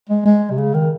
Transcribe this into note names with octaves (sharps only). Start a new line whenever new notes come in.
G#3
G#3
C3
C#3
D#3